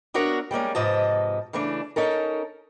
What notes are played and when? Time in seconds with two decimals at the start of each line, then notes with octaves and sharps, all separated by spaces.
0.14 B3 D4 F#4 A#4 C#5 E5
0.51 G3 G#3 A#3 C#4
0.75 G#2 C3 F3 B4 D#5 A5
1.53 C#3 E3 A3 D4
1.96 C#4 D#4 A4 A#4